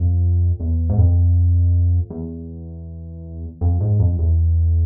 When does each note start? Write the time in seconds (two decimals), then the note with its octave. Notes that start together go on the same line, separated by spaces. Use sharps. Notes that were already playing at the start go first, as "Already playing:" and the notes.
Already playing: F2
0.60 E2
0.89 G#2
0.98 F2
2.10 E2
3.61 F2
3.81 G#2
4.00 F2
4.19 E2